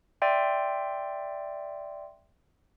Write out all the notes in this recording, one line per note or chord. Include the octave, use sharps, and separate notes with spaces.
D5 E5 G5 C6